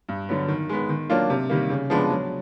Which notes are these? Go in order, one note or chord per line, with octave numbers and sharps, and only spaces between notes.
G2
D3 F#3 B3
D#3
G#3 B3
D#3
F#3 A#3 D4 F4
C3
D#3 G3 A#3
C#3
F3 G#3 B3 D4
F#3